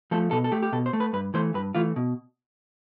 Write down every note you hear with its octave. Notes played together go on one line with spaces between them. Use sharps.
F3 A3 A4
B2 A4
A4
A3 G4
G4
B2 A4
C5
A3
B4
G2 B4
E3 A3 C5
G2 B4
E3 A3 F4
B2